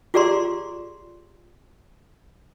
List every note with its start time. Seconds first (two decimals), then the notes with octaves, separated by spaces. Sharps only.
0.14 F4 G4 G#4 D5 A#5 C6